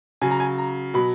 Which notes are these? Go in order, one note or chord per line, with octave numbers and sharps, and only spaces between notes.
C#3 F#3 G#5
A#5
G#5
A#5
B2 F#3 B5